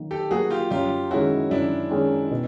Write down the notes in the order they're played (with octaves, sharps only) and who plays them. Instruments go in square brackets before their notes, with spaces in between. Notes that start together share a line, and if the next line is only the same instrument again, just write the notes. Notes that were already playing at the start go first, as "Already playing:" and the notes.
Already playing: [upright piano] D#3 F#3 A#3
[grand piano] G4 A4
[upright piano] F#3 A#3 [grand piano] F#4 G#4
[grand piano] F4 G4
[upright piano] F#2 [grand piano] F4 G4
[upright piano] D#3 G#3 C#4 [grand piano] E4 F#4
[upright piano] F#2 [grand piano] D4 E4
[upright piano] D#3 G#3 C#4
B2